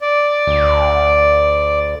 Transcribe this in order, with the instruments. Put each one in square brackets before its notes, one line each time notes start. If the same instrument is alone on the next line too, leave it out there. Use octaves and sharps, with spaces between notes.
[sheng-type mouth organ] D5
[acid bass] D2